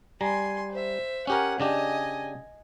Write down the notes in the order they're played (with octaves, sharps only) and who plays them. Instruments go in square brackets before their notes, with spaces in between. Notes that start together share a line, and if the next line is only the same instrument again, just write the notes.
[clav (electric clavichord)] G3 A#5 [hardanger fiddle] G#5 C6
[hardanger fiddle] C5 E5
[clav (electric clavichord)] C#4 G4 A#4 [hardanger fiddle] F#5 G#5
[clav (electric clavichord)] C#3 D4 G4 [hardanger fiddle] D#5 G#5